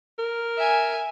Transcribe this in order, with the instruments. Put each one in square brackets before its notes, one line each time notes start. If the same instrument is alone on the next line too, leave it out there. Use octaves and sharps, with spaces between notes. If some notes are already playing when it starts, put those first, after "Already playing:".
[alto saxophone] A#4
[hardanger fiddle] E5 G#5